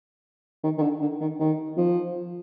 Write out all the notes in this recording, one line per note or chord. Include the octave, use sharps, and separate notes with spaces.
D#3
D#3
D3
D3
D#3
D#3
F3